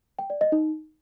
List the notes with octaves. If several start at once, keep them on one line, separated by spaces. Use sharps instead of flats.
G5
D5
D#5
D#4